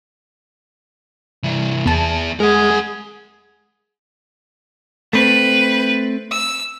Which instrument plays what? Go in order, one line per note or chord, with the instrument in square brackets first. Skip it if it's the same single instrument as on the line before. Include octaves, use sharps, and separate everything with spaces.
[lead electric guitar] C2 E3
[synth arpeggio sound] E2 A5 [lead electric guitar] B3 G#4
[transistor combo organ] G#3 [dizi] G#4 [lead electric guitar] A#4 F#5
[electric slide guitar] A3 C4 [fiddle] B4
[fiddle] E6